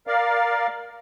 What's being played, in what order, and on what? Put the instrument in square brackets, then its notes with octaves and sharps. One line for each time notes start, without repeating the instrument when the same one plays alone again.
[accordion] A#4 D5 F5